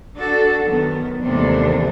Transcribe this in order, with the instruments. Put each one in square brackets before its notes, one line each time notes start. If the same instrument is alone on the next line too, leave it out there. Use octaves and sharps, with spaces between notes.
[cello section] D4 F#4 A4
F#2 D#3 B3
D#2 G#2 C3 E3 A3 D4